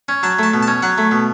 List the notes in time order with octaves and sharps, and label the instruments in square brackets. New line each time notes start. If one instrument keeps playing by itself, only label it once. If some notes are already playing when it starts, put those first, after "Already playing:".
[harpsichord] C#4
F#3 A5
A3 A5
B2
A5
C#4
F#3 F#5
A3
B2